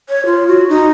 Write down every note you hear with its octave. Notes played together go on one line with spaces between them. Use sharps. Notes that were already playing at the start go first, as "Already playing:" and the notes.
C#5
F4
F#4
D#4